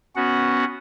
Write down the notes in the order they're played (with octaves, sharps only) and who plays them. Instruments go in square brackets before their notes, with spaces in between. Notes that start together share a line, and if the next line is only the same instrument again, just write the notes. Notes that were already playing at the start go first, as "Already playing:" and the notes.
[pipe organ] B3 C#4 F#4 F#5